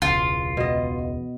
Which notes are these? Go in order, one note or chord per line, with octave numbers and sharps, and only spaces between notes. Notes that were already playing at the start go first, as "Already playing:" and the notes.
E1 C#2 F4
B2 D#5